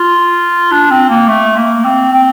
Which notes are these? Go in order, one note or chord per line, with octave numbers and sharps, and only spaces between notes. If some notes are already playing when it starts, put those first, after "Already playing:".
Already playing: F4
D4
C4
A#3
A3
A#3
C4
C4